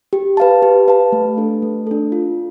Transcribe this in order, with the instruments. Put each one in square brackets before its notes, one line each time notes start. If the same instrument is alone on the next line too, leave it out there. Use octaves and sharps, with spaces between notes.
[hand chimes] G4
B4 F5 A5
G4
B4 F5 A5
A3
D4 A4
A3
D4 A4
F4